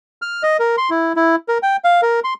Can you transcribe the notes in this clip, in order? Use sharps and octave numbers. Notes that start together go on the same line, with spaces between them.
F6
D#5
A#4
C6
E4
E4
A#4
G5
F5
A#4
C6